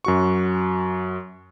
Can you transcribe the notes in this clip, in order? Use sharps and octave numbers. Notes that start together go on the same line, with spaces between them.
F#2 F#4 C#6